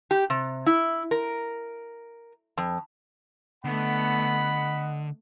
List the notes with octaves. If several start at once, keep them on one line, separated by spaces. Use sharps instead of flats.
G4
C3
E4
A#4
F2
D3 A3 B3 D#5 F#5 B5